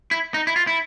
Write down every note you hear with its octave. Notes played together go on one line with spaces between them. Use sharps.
E4
D#4
E4
F4
E4